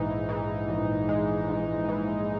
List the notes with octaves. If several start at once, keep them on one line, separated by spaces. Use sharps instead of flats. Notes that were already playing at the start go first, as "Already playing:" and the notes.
Already playing: A#1 G#2 E3 D#4
E3
A#1
G#3
G#2
E3